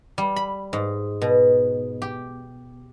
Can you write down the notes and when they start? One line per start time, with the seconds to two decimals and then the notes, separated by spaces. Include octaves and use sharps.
0.18 G3
0.36 B5
0.73 G#2
1.22 B2
2.02 G4